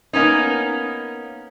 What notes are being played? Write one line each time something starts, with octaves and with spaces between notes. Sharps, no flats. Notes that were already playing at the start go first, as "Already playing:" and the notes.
A#3 B3 C#4 D#4